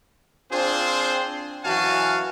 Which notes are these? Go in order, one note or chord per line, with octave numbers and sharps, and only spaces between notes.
C4 D4 F4 G#4 C5
F#2 E3 F#4 F5 G#5 A5